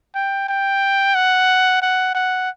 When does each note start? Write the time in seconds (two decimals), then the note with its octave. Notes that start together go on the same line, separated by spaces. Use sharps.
0.15 G5
0.48 G5
1.15 F#5
1.82 F#5
2.15 F#5